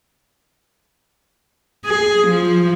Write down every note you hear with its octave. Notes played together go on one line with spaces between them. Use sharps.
G#4
F3